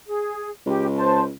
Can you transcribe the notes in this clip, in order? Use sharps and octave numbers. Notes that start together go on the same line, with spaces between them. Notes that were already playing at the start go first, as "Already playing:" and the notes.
G#4
C#2 G4
C5 A5